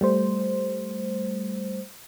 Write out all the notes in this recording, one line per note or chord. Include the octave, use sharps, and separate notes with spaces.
G3 A3 C5